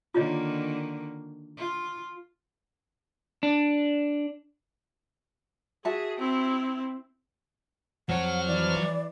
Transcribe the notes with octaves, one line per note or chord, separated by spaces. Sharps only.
D3 D#3 A#3 F4 C#5 D#5
F4
D4
F#4 G#4 E5 A5
C4 E4
F2 F3 F#3 C#5 F#5 F6
E3 D5